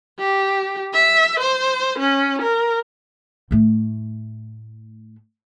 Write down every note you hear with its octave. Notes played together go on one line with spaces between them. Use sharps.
G4
E5
C5
C#4
A#4
A2 A3